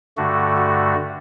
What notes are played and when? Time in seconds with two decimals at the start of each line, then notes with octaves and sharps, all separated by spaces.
0.17 G2 D3 A3 F#4
0.56 F#4